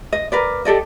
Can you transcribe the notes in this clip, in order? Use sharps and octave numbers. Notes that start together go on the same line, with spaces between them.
D#5
A#4 B4 D5
G4 A4 D5 D#5